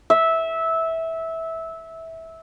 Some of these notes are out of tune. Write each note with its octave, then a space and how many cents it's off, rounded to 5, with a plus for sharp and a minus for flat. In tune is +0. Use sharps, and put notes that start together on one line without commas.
E5 -15